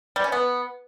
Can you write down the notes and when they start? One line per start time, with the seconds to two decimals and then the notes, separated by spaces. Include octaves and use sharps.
0.16 G3
0.24 C#4
0.32 B3